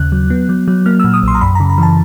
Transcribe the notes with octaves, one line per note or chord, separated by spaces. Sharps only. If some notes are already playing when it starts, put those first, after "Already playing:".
Already playing: D#2 C#3 F#6
F#3
B3
F#3
F#3
A#3 F6
A#2 E6
D#6
B1 C6
A#5
F#2 B5
C#3 A#5
A#5
E3 A5